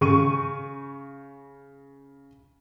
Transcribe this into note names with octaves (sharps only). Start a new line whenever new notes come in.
C#3 C#6 D#7